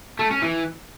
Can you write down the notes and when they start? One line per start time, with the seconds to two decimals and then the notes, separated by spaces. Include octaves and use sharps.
0.19 A3
0.31 C#4
0.42 E3